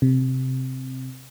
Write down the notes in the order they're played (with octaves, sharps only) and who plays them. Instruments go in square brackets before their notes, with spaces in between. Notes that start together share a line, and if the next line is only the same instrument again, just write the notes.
[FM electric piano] C3